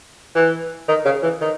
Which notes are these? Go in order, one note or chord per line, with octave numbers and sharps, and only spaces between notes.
E3
D#3
C#3
E3
D#3